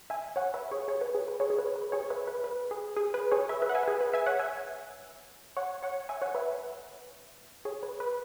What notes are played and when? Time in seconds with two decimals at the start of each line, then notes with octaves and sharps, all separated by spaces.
0.10 E5 G#5
0.36 C#5 F#5
0.54 B4 E5
0.71 G#4 C#5
0.88 G#4 C#5
1.01 B4
1.15 G#4
1.28 B4
1.40 G#4 C#5
1.50 G#4
1.59 B4
1.76 B4
1.92 G#4 C#5
2.10 B4 E5
2.27 B4
2.44 B4
2.71 G#4
2.97 G#4
3.14 B4
3.31 G#4 C#5
3.49 B4 E5
3.62 B4 E5
3.69 F#5
3.75 E5 G#5
3.83 B4
3.88 G#4
4.01 B4
4.14 E5 G#5
4.26 C#5 F#5
4.39 E5 G#5
5.57 C#5 F#5
5.83 C#5 F#5
6.09 E5 G#5
6.22 C#5 F#5
6.35 B4 E5
7.65 G#4 C#5
7.83 B4
8.00 B4